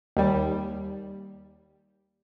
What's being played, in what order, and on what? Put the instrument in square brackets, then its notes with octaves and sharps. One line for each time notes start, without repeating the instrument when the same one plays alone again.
[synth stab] D#2 G3